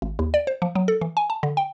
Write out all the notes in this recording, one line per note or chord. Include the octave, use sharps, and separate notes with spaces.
G#1
D#2
D5
C5
F3
F#3
A4
E3
G#5
A5
D3
G5